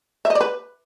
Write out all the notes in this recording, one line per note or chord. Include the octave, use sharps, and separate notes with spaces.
E5
D#5
D5
B4